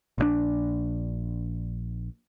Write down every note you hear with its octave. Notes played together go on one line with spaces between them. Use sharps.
A#1 E3 D4